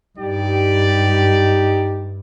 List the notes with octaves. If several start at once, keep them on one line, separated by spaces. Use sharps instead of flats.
G2 D#4 G4 D5